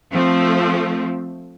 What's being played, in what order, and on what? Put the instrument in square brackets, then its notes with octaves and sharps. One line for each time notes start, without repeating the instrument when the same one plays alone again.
[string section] F3 A3 C4